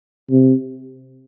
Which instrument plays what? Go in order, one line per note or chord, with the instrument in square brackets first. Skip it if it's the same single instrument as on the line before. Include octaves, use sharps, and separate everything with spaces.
[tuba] C3